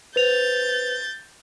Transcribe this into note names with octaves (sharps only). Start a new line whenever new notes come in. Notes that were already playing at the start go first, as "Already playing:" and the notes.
B4 C5 G6 A6 F7